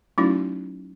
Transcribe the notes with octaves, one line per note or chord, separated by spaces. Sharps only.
F#3 A3 C#4 D#4 E4 F#4